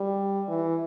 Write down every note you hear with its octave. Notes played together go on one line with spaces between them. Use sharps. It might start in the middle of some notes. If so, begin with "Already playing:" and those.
Already playing: G3
E3